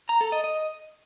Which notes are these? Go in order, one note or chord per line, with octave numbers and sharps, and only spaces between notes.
A#5
A4
D#5
D#5